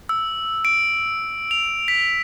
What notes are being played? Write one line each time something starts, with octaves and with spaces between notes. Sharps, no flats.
E6
D7
F7
B6